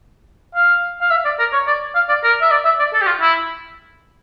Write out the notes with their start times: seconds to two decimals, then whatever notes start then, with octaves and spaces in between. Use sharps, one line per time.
0.55 F5
1.01 F5
1.11 E5
1.25 D5
1.39 A#4
1.53 C#5
1.67 D5
1.95 F5
2.09 D5
2.24 A#4
2.42 E5
2.51 D5
2.65 E5
2.79 D5
2.93 A4
3.01 G4
3.07 F4
3.21 E4